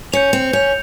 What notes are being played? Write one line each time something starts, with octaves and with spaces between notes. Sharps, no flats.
C#4 G6 C#7 F7
C4
C#4 G6 C#7 F7